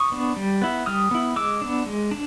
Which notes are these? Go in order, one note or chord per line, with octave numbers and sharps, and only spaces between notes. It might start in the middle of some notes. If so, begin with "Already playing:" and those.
Already playing: C#6 D#6
B3 D4
G3
B3 E4
G3 D#6 F6
B3 E4
G#3 D6 E6
B3 D4
G#3
D4